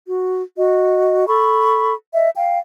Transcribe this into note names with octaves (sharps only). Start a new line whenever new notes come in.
F#4
F#4 D#5
A4 B5 C#6
D#5 E5
F5 G5